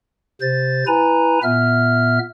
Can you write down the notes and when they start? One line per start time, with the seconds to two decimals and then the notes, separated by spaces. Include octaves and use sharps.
0.41 C3 C5 A6
0.87 E4 B4 G#5 A#5
1.43 A#2 B3 E5 F6